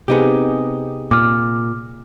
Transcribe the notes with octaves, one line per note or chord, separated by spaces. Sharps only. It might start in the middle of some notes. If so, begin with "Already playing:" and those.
C3 B3 C4 D#4 G4 G#4
A#2 D6 F6